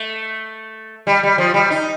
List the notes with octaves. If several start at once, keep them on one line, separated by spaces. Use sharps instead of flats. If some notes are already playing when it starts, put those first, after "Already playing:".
Already playing: A3
G3
G3
F3
G3
D#4